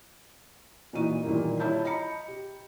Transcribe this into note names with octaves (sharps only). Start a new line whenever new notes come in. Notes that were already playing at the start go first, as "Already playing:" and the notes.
A#2 E3 D#4 F#4 D#7
A#2 D#3 E3 G3 A#3
E4 F4 C#5 A5 G6
D#5 A#5 B5 C#7
G4